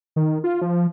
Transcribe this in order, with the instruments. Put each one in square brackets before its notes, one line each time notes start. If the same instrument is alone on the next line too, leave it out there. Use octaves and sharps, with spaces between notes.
[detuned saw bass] D#3
F4
F3